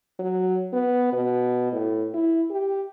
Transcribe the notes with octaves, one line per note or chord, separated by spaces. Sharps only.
F#3
B3
B2
A2
E4
G4